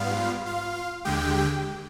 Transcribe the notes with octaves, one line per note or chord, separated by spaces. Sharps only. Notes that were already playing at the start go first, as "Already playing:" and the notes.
Already playing: G#2 G3 B3 F4 F5
F4 F5
D#2 D3 G#3 G4 G5